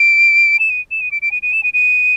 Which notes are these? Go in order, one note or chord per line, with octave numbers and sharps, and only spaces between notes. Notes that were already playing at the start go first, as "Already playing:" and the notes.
Already playing: D7
E7
D#7
E7
D#7
D7
D7
D#7
D#7
E7
D#7
D#7